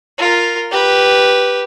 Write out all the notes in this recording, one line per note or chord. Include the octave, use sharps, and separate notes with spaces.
F4 A#4
G4 B4